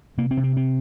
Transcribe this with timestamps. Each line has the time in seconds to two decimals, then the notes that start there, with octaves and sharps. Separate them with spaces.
0.18 C3 A#3
0.31 C4
0.37 C3
0.44 C4
0.57 C4